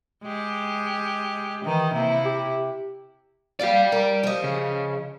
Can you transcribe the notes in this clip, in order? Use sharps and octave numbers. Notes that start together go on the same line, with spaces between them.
G#3 G4
D#3 E3 D#4
C3 A#3 E4
G4
A#2 F4 G4 D5 F5
A#4
F3 D#5
C#3